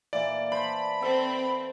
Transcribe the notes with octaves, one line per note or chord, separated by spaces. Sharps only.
A#2 E3 D5
C5 A5 B5
C4 A4